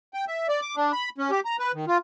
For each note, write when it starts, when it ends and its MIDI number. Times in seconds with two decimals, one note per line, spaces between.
0.14 0.25 79
0.28 0.48 76
0.49 0.61 74
0.61 0.75 86
0.76 0.92 62
0.93 1.09 83
1.18 1.31 61
1.31 1.40 67
1.45 1.57 82
1.59 1.72 71
1.74 1.85 51
1.88 1.98 65